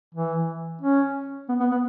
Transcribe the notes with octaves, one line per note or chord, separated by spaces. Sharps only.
E3
C#4
B3
B3
B3